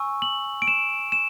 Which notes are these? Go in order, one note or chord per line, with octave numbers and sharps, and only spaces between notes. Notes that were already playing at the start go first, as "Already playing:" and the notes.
Already playing: G#5 C#6 E6
F#7
D7
E7
E7